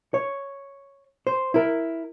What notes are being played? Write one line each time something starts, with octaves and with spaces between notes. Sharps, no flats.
C#5
C5
E4 A#4